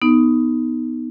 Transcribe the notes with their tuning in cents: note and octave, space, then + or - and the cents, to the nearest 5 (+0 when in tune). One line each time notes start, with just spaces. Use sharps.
B3 +0 D#4 +0